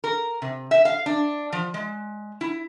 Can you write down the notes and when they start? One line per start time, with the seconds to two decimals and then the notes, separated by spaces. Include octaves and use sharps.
0.04 A#4
0.42 C3
0.71 E5
0.85 F5
1.06 D4
1.52 F3
1.74 G#3
2.41 E4